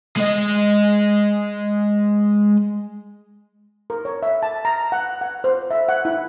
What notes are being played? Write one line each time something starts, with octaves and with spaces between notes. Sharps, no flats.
G#3 D#5
A#4
C#5
E5
A5
A#5
F#5
F#5
C5
E5
F#5
E4